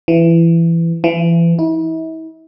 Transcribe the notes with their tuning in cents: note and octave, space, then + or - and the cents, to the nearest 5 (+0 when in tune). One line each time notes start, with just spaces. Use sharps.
E3 +20
E3 +35
E4 -40